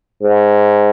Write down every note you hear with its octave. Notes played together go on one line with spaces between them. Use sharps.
G#2